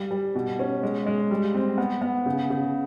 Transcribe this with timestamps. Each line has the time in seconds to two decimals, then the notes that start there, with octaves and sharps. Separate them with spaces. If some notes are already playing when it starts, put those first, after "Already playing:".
Already playing: G3
0.11 G3
0.35 B2
0.59 C#4
0.83 G#3
1.06 G#3
1.31 G3
1.55 C4
1.78 B3
2.02 B3
2.26 C#3
2.50 C#3